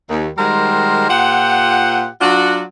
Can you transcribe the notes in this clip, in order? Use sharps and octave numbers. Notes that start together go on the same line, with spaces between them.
D#2
D#3 G3 G#3 F#4 A#4 C5
A#2 F4 G4 C5 F#5
F#3 D4 F4 F#4